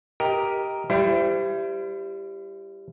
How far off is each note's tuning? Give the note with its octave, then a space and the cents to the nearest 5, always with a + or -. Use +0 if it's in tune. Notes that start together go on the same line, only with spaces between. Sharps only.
G4 +0 A#4 +5 D#5 +15
G3 +0 E4 +30 C5 -30